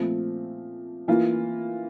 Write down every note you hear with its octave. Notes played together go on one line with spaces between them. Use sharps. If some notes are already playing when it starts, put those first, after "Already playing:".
Already playing: A#2 F3 A3 C4
E3 A#3 F4